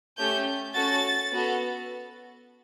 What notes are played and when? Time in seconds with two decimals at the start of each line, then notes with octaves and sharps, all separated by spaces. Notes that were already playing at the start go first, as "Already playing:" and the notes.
0.18 A3 C#4 G4 G6
0.75 C#4 F#4 A4 A6
1.33 B3 F#4 A4